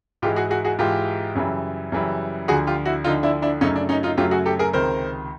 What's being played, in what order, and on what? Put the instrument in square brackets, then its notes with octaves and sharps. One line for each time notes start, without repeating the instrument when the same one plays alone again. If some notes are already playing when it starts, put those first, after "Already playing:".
[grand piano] G#2 E3 G#3 F4 G4
F#4 G#4
F#4 G#4
F#4 G#4
G#2 E3 G#3 F4 G4
F#2 C#3 E3 G3
F#2 C#3 E3 G3
D2 D3 F3 F#4 G#4
F4 G4
E4 F#4
D2 D3 F3 D#4 F4
D4 E4
D4 E4
F#2 C#3 F#3 A3 C#4 D#4
D4
C#4 D#4
D#4 F4
F#2 C#3 F#3 A3 F4 G4
F#4 G#4
G4 A4
G#4 A#4
C#2 C3 D#3 A#4 C5